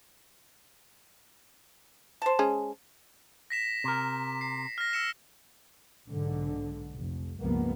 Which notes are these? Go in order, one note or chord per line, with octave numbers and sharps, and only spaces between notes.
C5 A5
G#3 C#4 G#4
A#6 B6 E7
C3 A#4
C7
F6 A#6
E6 C#7 E7
B1 G#2 D3
F1
C#2 G2 A#2 F3 A#3 B3